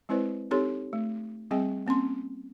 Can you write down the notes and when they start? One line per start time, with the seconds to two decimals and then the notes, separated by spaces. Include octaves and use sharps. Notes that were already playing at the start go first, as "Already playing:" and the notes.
0.09 G#3 C4 E4 B4 C5 D5
0.51 C4 D#4 G4 A4 C#5 C6
0.93 A3
1.51 G3 C4 G#4 D#5 G5
1.87 A#3 C4 C#4 C6